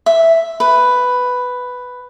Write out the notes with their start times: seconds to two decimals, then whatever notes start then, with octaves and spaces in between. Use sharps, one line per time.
0.06 E5
0.60 B4